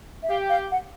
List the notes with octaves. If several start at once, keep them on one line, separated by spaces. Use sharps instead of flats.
E5
G4 F5
F5
F#5